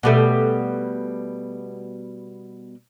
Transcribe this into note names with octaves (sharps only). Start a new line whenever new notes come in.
B2 G3 A3